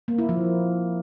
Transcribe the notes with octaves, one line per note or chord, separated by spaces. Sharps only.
A#3
E4
F3